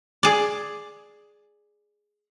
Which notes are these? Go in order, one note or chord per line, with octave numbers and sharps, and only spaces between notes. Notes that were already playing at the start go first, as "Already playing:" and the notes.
G#4 D5